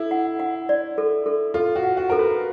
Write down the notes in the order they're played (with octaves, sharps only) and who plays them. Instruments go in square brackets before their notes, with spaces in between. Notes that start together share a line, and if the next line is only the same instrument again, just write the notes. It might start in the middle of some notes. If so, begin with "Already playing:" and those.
Already playing: [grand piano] E4 [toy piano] A4
[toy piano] F#5
F#5
D5
A4
A4
[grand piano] F4 [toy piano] A4
[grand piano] F#4
[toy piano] F#5
[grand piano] F#4
[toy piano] A4 [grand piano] A#4
[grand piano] B4